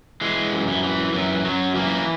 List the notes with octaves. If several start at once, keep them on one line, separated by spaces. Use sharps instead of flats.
E3 G#3
F#2
E3
E3
F#2 E3
F#2 F#3
E3 A#3